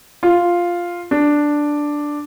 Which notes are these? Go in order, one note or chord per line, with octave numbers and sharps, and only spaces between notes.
F4
D4